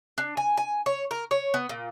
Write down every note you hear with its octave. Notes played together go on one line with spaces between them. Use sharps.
D4
G#5
G#5
C#5
A#4
C#5
B3
A#2